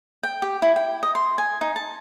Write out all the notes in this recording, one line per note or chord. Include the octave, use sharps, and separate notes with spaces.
G5
G4
E4
G5
D#5
C6
G#5
D#4
A5